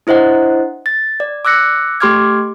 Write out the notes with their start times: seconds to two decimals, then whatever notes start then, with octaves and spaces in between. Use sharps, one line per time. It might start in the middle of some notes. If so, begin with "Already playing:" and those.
0.07 D4 E4 C5 D#5 F#5
0.86 A6
1.20 D5
1.45 D6 E6 F#6 A#6 C#7
2.00 A3 G4 C6 D6 F6 G#6